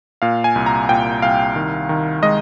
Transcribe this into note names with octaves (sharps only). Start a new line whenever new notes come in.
A#2 F5
G#5
C2
A#5
A#2 G5
C2 F5
D#3
D#3
G#3 D#5